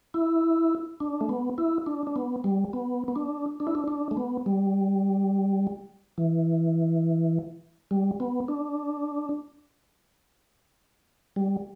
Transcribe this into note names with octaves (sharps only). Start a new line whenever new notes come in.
E4
D4
A3
B3
E4
D4
D4
B3
G3
B3
B3
D4
D4
E4
D4
D4
A3
B3
G3
E3
G3
B3
D4
G3